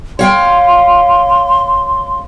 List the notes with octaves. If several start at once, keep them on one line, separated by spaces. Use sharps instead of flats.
C#5 F5 G5 C6